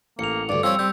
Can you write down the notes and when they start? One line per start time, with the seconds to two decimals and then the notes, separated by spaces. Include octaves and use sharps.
0.19 A1 A#3 C#7 F7
0.49 D2 G2 D5
0.63 F3 G3 C4 C#5 E6
0.79 G3 C4 G6